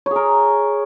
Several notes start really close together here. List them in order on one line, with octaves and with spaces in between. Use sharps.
C#5 G#4 A#4